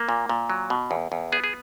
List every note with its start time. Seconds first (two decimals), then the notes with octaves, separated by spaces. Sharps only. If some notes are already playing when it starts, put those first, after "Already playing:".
Already playing: A#3
0.09 A#2
0.29 A#2
0.50 F#3
0.70 B2
0.91 E2
1.12 E2
1.32 B3 G#4
1.44 G#4